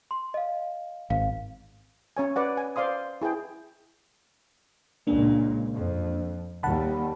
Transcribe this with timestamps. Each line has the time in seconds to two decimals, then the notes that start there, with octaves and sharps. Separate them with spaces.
0.11 C6
0.34 D#5 F5
1.10 G#1 F5
2.17 C#4 C#5 G#5
2.36 B4 D5 F#5
2.57 G#5
2.76 C5 D5 F5 C6 D#6
3.22 E4 G#4 B4 G5
5.07 C#2 A#2 A#3 D4
5.75 F2
6.63 D#2 G3 F#5 A5 B5